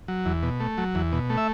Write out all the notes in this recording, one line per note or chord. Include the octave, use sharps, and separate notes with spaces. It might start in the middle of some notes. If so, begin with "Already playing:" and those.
F#3
E2
B2
A3
F#3
E2
B2
A3
E5